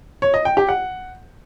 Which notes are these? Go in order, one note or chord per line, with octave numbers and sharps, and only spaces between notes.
C#5
D#5
G5
G4
F#5